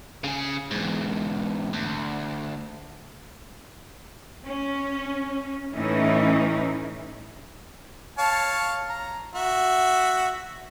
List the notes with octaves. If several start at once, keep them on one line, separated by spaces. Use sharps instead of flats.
C#3 G#4
E2 G#2
D2
C#4
A2 E3 C#4 D#4
C#5 F5 A5
A#5
F#4 E5